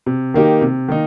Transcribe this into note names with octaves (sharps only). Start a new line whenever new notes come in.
C3
D#3 A#3 D#4 G4
C3
D#3 A#3 D#4